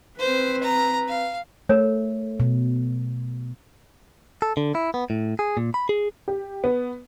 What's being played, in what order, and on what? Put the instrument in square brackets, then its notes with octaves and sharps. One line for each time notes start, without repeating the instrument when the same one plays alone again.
[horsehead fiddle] C4 B4 [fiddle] C5
[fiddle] A#5
F5
[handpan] A3 [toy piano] A#4 C#5
[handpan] B2
[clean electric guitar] A4
D3
E4
B3
A2
G#4
A#2
B5
G#4
[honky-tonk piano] G4
B3